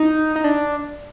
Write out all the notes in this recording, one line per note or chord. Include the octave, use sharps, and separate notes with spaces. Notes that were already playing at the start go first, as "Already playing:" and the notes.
Already playing: D#4
D#4
D4